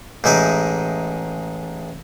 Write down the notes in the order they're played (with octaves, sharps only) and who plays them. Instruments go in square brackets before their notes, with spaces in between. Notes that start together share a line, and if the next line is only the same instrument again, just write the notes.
[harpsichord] A1 G#3 D#4 E5 D6